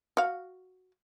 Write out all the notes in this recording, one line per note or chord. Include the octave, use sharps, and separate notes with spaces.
F#4 F5